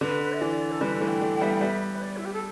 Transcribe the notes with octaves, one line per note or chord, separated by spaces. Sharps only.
D3 B4
E5
E3 D5
A4
D3 G3 B4
E3 A3
G5
A3 D4
G5
G3 B3 E5
G5
G3 B3 E5
B4
D5
E4
G4
A4